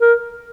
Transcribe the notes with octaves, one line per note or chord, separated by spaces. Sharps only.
A#4